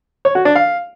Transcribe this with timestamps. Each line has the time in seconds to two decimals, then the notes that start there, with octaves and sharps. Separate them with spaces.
0.25 C#5
0.35 F#4
0.45 D4
0.55 F5